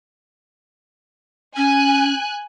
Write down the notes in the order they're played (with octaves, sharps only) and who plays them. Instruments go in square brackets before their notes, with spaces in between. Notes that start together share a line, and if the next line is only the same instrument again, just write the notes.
[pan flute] C#4 [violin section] G#5 F#6